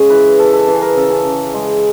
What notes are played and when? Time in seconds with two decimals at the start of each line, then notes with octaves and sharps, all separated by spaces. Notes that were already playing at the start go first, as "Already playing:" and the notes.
Already playing: C#3 G#3 G#4
0.10 E3 B4
0.39 E3 A4
0.53 A4
0.68 E3 G#4
0.82 A#4
0.96 C#3 A4
1.10 G#4
1.25 C#3
1.54 G#3